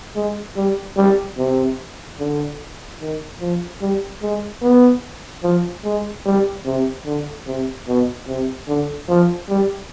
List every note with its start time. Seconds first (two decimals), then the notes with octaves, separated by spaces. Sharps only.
0.16 G#3
0.56 G3
0.97 G3
1.38 C3
2.19 D3
3.01 D#3
3.40 F3
3.82 G3
4.22 G#3
4.62 B3
5.43 F3
5.85 G#3
6.26 G3
6.66 C3
7.06 D3
7.47 C3
7.88 B2
8.28 C3
8.68 D3
9.09 F3
9.49 G3